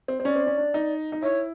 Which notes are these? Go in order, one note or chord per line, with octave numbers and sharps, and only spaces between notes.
C4
C4
C#4 D5
C4
C#4
D4
D#4
D#4
E4 C#5